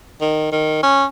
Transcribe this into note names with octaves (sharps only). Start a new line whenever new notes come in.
D#3
D#3
C#4